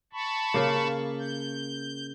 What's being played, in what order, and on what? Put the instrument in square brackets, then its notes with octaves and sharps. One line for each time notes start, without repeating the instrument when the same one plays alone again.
[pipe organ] A5 B5 C#6
[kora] C#3 A#3
[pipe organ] G6